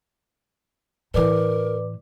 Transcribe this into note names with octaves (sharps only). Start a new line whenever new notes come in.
A2 E3 A#4 B4 D5 D6